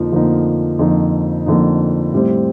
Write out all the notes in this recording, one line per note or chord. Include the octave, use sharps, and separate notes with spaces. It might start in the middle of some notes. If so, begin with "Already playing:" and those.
Already playing: F2 D3 F3 A#3 D#4
F2 D3 F3 A#3 D#4
F2 D3 F3 A#3 D#4
F2 D3 F3 A#3 D#4
A2 G3 C4